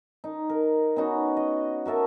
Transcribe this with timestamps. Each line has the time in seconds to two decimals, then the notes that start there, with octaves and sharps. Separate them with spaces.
0.24 D#4
0.49 A#4
0.96 B3 C#4 D#4 F#4
1.37 D#5
1.86 F#4 A#4 E5 A5